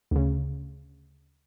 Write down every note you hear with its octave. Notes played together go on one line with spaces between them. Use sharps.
D2 C#3